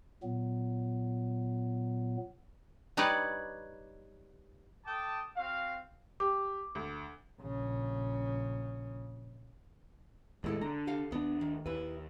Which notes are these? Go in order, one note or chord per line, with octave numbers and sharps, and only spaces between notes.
A#2 F#3 B3
G3 D#4 B4 C#5 D5
A4 G5 A5 D6 D#6
C4 F#4 F5
G4 D6
D2
A#1 C#3
D#2 A2 G#3 E4 A4
D3 A#5
G4 A4 F5
D#2 B3 D4
D#3
D#2 E4 B4